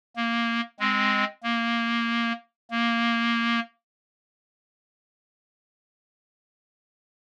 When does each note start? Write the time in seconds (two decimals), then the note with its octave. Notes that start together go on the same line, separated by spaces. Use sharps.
0.16 A#3
0.80 G#3 C4
1.43 A#3
2.71 A#3